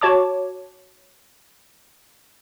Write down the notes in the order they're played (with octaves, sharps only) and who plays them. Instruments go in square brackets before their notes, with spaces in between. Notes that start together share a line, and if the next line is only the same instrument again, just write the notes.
[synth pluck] F#4 C#5 A5 D6